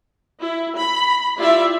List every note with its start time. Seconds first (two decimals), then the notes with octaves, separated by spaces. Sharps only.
0.41 E4
0.78 B5
1.37 E4 F4 G4 D5 E5